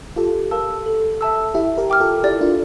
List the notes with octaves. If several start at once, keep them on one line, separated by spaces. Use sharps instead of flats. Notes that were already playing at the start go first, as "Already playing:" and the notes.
F4 G4 A4
A#4 F5 A5 E6
A4
E5 A5 E6
E4 G4 E5
G4 A#4
G5 D6 F6
F4 A4
E4 G4 D5
D4 F4